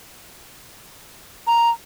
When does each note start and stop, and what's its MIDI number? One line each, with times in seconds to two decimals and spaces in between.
1.47 1.69 82